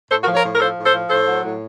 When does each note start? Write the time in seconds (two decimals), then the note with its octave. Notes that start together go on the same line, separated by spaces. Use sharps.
0.11 A2 A4 C5
0.23 F#4 A#4
0.27 F3
0.35 A#4 C#5
0.45 A2
0.55 A#4
0.60 F3 A4 C5
0.77 A2
0.86 A4 C5
0.94 F3
1.10 A2 A4 C5
1.27 F#3
1.44 A2